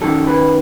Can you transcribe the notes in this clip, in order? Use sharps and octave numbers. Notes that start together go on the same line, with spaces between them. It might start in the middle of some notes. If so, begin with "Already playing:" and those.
F#2 D#3 F#3 A4
B4